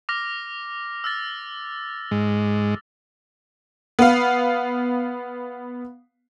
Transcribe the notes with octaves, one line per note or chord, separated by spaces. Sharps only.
D6 F6 A#6
E6 F6 A6
G#2 G#3
B3 F5